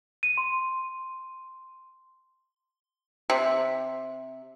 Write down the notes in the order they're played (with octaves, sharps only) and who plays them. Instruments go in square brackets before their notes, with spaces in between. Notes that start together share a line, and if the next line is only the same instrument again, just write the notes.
[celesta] D#7
C6
[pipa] C3